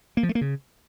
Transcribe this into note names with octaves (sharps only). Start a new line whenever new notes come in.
A#3
F3
A3
A#3
C#3